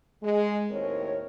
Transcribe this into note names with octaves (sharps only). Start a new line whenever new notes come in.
G#3
D#2 A2 C4 A#4 C#5